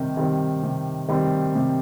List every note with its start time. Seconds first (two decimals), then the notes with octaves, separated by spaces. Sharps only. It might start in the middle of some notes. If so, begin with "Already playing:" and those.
Already playing: C3 D#3 G3 C4
0.17 D#3 G3 C4
0.63 C3
1.08 D#3 G3 C4
1.55 C3